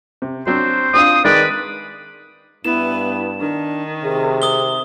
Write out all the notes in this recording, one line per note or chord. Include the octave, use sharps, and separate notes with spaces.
C3
F#3 C4 D4 C5
C4 D4 F4 D#6
D#3 G#3 B4 D5
G2 B3 E4 E7
D#3 D4
C3 G#4
D#6 G7